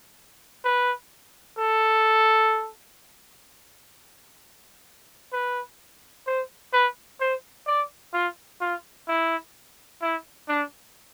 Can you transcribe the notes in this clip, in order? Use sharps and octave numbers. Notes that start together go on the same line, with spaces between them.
B4
A4
B4
C5
B4
C5
D5
F4
F4
E4
E4
D4